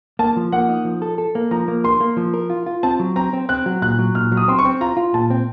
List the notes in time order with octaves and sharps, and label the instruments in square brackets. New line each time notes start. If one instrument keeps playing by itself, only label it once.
[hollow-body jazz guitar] A#3 [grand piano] A5
[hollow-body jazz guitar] F3
[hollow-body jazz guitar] A#3 [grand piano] F#5
[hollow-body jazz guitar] D#4
F3
A4
A4
A#3
[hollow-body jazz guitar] F3 [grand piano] A#5
[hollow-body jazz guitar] A#3
[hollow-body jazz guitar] A#4 [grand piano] C6
[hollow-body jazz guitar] A#3
F3
A#4
F4
F4
[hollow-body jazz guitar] C4 [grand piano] A5
[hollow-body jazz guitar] F#3
[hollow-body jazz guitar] C4 [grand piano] A#5
[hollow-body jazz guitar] C4
[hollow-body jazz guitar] C4 [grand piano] F#6
[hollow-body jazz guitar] F#3
[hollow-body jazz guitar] A#2 [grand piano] F#6
[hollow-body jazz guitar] F#3
[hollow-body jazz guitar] A#2 [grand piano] F6
[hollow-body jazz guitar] F#3
[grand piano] D#6
[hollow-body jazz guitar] C4 [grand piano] C6
[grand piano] C#6
[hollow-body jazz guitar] C4
[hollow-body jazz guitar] F4 [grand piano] A#5
[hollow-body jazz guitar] F4
[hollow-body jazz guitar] A#2 [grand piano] A5
[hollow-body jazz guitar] C4